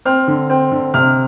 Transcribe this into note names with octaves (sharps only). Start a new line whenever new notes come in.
C4 F6
D3
C4
D3
C3 F6